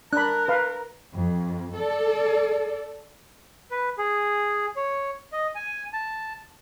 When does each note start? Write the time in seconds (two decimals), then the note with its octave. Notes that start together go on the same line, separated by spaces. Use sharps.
0.13 D4 A#4 B5 F#6
0.48 B4 F5
1.14 F2
1.75 A4 D5
3.71 B4
3.98 G#4
4.76 C#5
5.32 D#5
5.55 G#5
5.93 A5